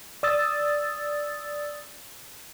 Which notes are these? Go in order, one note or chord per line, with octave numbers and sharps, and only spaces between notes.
D5 D#6 E6 A6